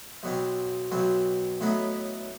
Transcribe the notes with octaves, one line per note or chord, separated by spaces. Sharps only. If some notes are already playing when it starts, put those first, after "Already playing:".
B1 B2 F#3 C4
B1 B2 F#3 C4
A2 F#3 B3 D#4